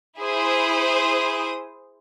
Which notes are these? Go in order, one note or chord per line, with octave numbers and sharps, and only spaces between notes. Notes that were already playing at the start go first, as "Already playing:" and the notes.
E4 G#4 C5 D#6